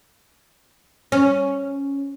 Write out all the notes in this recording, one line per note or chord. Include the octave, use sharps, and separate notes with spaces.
C#4